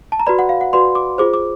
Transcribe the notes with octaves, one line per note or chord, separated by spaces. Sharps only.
A5
A#5
F#4 B4 D5 B5
F#5
F5
F#5
F#4 B4 D5 C6
D6
F4 G#4 C5 D6
D6